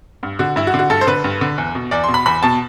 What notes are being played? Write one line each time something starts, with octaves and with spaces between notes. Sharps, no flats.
G2
D3 F#4
G2 E4
F#4
D3
F#4
G2 A4
C5
D3 B4
G2
D3
E2
B2
E2 D5
C6
B2
B5
E2 B5
B2 A5